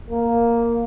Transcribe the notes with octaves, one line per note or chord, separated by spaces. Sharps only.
A#3